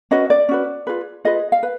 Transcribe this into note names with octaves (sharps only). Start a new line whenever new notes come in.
C#4 F#4 B4 D#5
D5
C#4 F#4 B4
F4 G#4 B4
F4 G#4 B4 D#5
F5
B4